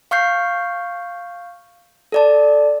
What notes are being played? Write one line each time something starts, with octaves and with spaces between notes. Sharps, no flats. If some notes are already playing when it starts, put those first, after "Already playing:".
F5 C#6 F6 G6 C7
A4 D5 A5